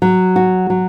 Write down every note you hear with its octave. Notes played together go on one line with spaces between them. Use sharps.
F#3
F#4
F#3